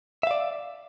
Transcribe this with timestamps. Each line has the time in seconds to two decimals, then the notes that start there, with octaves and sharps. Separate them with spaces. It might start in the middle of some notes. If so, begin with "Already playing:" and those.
0.23 E5
0.27 F5
0.31 D5